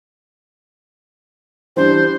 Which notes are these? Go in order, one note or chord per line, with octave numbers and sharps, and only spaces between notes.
E3 G3 D4 C5